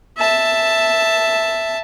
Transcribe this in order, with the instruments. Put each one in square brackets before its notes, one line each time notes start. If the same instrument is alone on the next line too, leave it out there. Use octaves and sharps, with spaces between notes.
[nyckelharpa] E5 A5